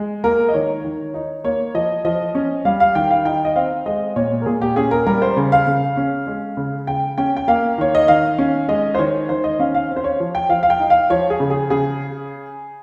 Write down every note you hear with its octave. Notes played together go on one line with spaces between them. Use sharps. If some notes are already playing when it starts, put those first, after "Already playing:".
Already playing: G#3
A#3 A#4
D#5
D#3 C#5
D#3
D#4
A#3 C#5
F3 D#5
F3 D#5
C#4
G3 F5
F5
D#3 G5
F5
D#4 G5
D#5
C4 F5
G#3 D#5
A#2 C#5
A#4
A#2 G#4
G4
C#4 G#4
A#4
G3 A#4
C5
C#3
F5
C#3
C#4
G#3
C#3
C#3 G5
C#4 G5
G5
A#3 F5
D#3 C#5
D#5
D#3 F5
C#4
G#3 D#5
C5
D#3 C#5
D#3 C5
D#5
C#4 F5
F5
C4
C5
C#5
F3
G5
F3 F5
F5
G5
D#4
F5
F3 C#5
G#4
C#3
G#4
C#3 G#4